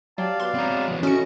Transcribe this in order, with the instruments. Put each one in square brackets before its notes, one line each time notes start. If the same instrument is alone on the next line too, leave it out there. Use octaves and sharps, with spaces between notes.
[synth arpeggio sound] F#3 [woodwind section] G4 A5 [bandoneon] D5 F5
[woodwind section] B2 D4 [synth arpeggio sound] C6
[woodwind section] F#3 G#3 B3 [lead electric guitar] C4 A#5
[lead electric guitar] E2 F3
[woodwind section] A2 D#5 [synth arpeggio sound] C#4 C#7 [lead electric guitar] F#4